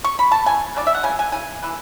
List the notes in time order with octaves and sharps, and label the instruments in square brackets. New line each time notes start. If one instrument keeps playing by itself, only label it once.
[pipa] C#6
B5
A5
C#3 E3 G#5
C#3 E3 G#3 D4 D5
E5
F#5
C#3 E3 G#5
G#5
C#3 E3 G#5
E3 B3 D4